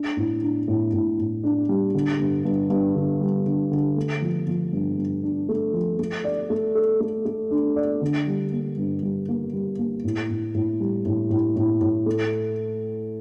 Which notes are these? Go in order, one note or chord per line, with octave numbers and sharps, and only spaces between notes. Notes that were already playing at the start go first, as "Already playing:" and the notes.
Already playing: D4
A2
D4
A2
A2
A2
D4
G3
D3
G2
G2
G2
D3
G3
D3
D3
A3
F3
F3
G2
G2
D4
A3
F3
A3
D5
A3
A4
A3
A3
D4
D5
D3
G3
A#3
G2
G3
A#3
G3
A#3
A2
A2
A2
G3
A2
A2
A2
A2
A3